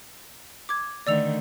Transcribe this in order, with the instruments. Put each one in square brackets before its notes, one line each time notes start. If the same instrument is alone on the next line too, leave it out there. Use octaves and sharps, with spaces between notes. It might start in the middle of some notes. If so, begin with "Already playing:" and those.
[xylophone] D6 G#6
[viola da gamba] D3 D#3 A3 [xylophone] D5 E6 F7